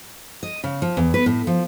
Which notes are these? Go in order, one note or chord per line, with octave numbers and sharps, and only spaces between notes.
D#5
C#3
F3
E2
B4
A2
F3